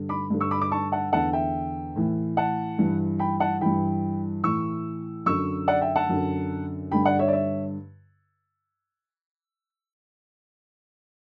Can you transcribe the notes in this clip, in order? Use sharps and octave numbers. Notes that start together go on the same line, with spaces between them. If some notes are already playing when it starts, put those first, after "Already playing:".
Already playing: G2 D3
B5 D6
G2 D3
C#6 E6
B5 D6
B5 D6
A5 C#6
F#5 A5
E2 D3 F#5 A5
E5 G5
A2 E3
F#5 A5
G2 E3
G5 B5
F#5 A5
G2 E3 G5 B5
A2 E3 C#6 E6
F#2 D3 C#6 E6
D5 F#5
E5 G5
F#5 A5
F#2 D3
G2 D3 G5 B5
D5 F#5
C#5 E5
D5
C#5 E5